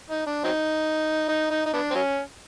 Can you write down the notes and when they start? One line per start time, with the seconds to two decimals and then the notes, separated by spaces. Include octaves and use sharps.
0.10 D#4
0.27 D4
0.44 F#3 C4 D#4
1.28 D#4
1.51 D#4
1.66 D#4
1.73 B3 D4
1.91 C4
1.95 F#3 C#4